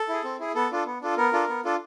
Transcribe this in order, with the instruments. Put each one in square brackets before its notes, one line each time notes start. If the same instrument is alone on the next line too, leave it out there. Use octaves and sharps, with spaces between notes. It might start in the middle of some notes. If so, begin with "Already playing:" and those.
Already playing: [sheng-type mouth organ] A4
E4 G#4
C4
E4 G#4
B3 A4
D4 F4 A4
B3
D4 F4 A4
B3 A#4
D4 F4 A4
B3
D4 F4 A4